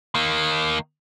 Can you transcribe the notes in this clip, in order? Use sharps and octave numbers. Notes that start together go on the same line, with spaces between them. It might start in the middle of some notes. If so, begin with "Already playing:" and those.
D#3 A#3